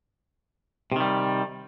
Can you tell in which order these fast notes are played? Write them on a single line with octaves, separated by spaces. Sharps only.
C3 D#3 G3